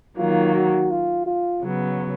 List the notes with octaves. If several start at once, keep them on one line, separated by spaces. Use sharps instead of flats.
D#3 F#3 A#3 F4
F#4
F4
F4
C#3 F#3 B3